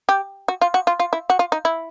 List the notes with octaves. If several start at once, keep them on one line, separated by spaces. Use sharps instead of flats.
G4
F#4
F4
F#4
F4
F4
E4
F#4
F4
D#4
E4